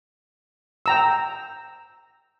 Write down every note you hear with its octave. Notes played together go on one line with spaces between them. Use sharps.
G5 A#5 E6